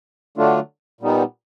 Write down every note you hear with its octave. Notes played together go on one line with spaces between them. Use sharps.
D3 F#3 A3 D4 F4
A#2 G3 B3 D#4